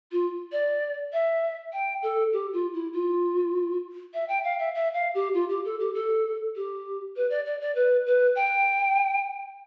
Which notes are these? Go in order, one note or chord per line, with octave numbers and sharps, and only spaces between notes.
F4
D5
E5
G5
A4
G4
F4
E4
F4
E5
G5
F5
E5
E5
F5
G4
F4
G4
A4
G4
A4
G4
B4
D5
D5
D5
B4
B4
G5